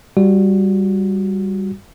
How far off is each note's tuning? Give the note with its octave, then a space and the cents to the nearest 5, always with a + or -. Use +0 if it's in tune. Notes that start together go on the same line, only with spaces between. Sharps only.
G3 +0 F#4 -20